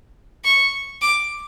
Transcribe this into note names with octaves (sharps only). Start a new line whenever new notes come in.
C#6
D6